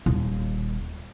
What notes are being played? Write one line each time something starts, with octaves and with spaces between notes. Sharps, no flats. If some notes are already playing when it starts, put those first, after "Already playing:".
D#1